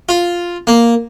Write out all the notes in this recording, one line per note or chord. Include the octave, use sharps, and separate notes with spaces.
F4
A#3